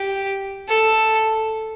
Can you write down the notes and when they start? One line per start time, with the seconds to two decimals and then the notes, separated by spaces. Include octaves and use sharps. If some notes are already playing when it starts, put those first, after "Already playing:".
Already playing: G4
0.68 A4